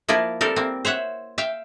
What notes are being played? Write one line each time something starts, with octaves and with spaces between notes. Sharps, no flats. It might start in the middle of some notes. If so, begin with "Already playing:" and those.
F3 A#3 E4 F4 A#4
G3 C4 A4 A#4
A#3 C4
C5 C#5 E5 F#5
E5 F5 G5